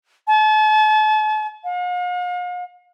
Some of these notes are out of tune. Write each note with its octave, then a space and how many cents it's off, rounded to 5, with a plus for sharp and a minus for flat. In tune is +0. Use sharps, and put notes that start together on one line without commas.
A5 -40
F5 +45